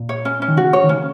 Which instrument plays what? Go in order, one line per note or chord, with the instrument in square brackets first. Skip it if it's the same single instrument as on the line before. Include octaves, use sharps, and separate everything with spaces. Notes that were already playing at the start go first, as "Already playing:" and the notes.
Already playing: [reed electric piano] A#2
[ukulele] C#5
C#4
C#4
[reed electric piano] D#3
[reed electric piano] C#3 [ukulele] F#4
[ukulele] C#5
[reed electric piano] D#3
[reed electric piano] C#3 [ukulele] C#4